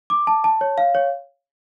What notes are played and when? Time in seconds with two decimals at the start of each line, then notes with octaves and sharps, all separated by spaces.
0.10 D6
0.27 A5
0.44 A5
0.61 C#5
0.78 F5
0.95 C#5